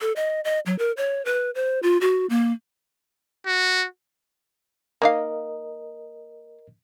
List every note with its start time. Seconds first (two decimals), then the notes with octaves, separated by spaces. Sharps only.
0.01 A4
0.16 D#5
0.44 D#5
0.66 F#3
0.78 A#4
0.97 C#5
1.25 B4
1.55 C5
1.83 F4
2.01 F#4
2.30 A#3
3.46 F#4
5.02 A#3 D#4 A#4 D#5 F5